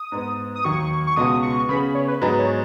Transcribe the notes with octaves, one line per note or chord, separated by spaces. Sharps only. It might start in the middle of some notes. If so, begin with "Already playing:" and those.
Already playing: D#6
G#2 G#3 B3
D#6
D#2 D#3 F#3 C#6
C#6
C#2 B2 G#3 B3 F#4 D#6
C#6
C#3 B3 G#4 B5
C#5
B4
G#2 F#3 B3 D#4 G#4 B4
C#5